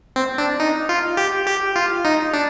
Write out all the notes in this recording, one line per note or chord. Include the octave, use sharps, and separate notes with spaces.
C4
D4
D#4
F4
G4
G4
F4
D#4
D4